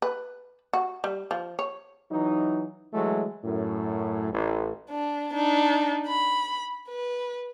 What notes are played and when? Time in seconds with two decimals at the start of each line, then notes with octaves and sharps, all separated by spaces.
0.02 B4
0.73 F#4
1.04 G3
1.31 F3
1.59 C#5
2.11 E3 F#3 D#4
2.93 E3 F#3 G#3 A3
3.44 F#2 A2
4.33 A1
4.90 D4
5.34 D4 D#4
6.07 B5
6.88 B4